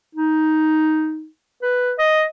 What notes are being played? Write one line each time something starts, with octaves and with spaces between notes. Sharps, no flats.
D#4
B4
D#5